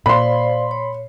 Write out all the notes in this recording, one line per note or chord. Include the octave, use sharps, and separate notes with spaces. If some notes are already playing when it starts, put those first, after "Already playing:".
A#2 C5 D5 F5 B5 C6
C#5